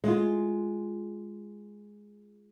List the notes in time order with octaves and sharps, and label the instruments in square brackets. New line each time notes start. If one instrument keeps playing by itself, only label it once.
[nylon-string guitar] G#3 F4